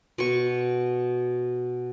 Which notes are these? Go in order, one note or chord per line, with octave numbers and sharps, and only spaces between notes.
B2 C#6